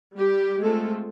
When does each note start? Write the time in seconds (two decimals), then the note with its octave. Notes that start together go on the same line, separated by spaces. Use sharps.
0.18 G3 G4
0.63 G#3 A3 C4 F4 A4